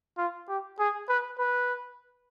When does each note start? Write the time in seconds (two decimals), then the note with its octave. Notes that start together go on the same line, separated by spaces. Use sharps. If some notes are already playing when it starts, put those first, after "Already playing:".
0.18 F4
0.49 G4
0.79 G#4
1.09 B4
1.39 B4